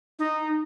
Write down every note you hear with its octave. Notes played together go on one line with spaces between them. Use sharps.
D#4